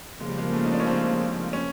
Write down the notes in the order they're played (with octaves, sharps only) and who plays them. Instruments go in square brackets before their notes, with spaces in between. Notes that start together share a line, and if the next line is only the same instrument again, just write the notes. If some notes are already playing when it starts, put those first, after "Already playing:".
[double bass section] C#3 F3 A#3 [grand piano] G#3
[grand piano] G3
G#3
A3
D#4
D4
C#4
C4
C#4